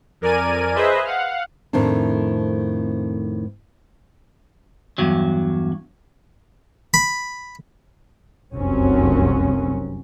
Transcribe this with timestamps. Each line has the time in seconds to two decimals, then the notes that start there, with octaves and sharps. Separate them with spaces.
0.21 F2 A#4 D5 G#5 D#7
0.75 G#4 B4 C5 D#5 E5
1.05 F5 F#5
1.73 F2 A2 D#3 A3 C4 D4
4.98 E2 G2 F#3
6.94 B5
8.53 F1 C2 F#2 F#3 C4 C#4